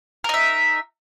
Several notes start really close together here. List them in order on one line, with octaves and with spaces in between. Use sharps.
A#4 D#4 E5